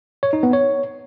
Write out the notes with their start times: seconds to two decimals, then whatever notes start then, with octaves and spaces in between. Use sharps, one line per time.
0.23 C#5
0.33 D#4
0.43 B3
0.53 C#5